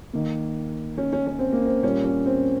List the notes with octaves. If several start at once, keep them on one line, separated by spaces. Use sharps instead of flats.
D#3 A#3
C#4
C#4
C#4
C4
A#3
C4
A#2 G3 A#3 C#4
C#4
C4